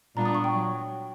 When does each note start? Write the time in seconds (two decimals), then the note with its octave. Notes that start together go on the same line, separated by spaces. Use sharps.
0.16 A#2 G3 B3 D4 F4 A#5
0.25 D#6
0.35 C#6
0.44 G5
0.54 F#3